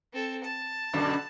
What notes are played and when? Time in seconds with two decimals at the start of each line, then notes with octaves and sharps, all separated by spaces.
0.13 C4 A4
0.44 A5
0.93 F#2 B2 D3